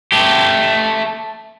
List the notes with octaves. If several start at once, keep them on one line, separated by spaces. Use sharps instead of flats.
A3 G4